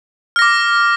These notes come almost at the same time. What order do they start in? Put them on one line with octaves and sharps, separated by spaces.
F6 A#6 D6